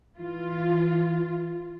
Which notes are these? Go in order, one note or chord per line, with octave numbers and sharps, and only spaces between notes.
E3 F4